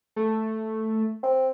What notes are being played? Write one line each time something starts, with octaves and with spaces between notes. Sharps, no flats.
A3
C4